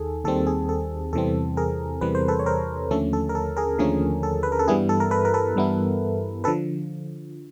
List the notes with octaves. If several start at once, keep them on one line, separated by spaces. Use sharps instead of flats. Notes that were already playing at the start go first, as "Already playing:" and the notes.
Already playing: D#2 D#3 G#4 A4
D#2 D#3 G3 C4 A4
G#4
A4
E2 C3 E3 G3 C4 A4
G#4 A#4
E2 C3 E3 G3 C4 B4
C5
A4 B4
C#5
A#4 C5
D#2 D3 F3 A3 C#4 A4
A4
A#4
A4
G#4 A#4
D#2 D3 F3 A3 C#4 G#4
A4
B4
A#4
A4
G2 E3 G3 B3 E4 G#4
A4
A#4
A4 B4
A#4
A4 B4
G2 E3 G3 B3 E4
D3 F3 A4 B4